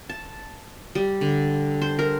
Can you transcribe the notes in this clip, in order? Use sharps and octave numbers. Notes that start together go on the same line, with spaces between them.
A5
G3
D3
C5
A#4